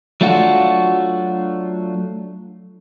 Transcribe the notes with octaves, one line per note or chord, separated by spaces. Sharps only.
F#3 A3 D4 F4 F#4